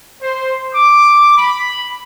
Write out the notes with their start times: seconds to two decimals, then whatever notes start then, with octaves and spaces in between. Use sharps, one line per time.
0.22 C5
0.74 D6
1.38 B5